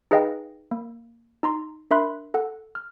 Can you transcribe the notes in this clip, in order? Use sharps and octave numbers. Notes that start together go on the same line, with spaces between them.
D#4 G#4 B4 D#5 F5 G5
A#3
D#4 A#5 C6
D4 A#4 E5 B5 C6 F#6
A4 F#5
F6